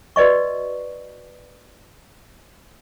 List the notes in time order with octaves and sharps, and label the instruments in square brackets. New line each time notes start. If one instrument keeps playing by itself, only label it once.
[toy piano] F#4 B4 D5 D#5 C#6